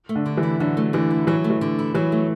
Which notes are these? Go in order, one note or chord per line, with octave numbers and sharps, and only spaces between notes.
A3
D3
D3
E3
E4
D3 F#3
A3
D3 E3
E4
E3 F#3
A3
E3
D3
E4
E3 F#3
A3